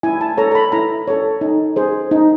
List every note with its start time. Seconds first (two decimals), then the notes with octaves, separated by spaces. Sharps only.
0.03 E4 G#5
0.21 A5
0.37 A4 C#5 A#5
0.51 A#5
0.55 B5
0.72 E4 A#5
1.08 A4 C#5
1.41 D#4
1.76 G#4 C5
2.11 D#4